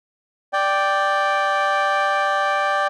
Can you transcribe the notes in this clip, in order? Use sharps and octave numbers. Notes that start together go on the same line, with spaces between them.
D5 G5